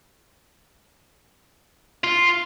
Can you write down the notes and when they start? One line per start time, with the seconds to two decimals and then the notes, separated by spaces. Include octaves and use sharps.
2.04 F4